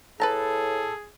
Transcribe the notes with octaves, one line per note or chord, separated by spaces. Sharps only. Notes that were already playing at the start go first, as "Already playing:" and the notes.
A2 G#4 A4 B4 A5 A#5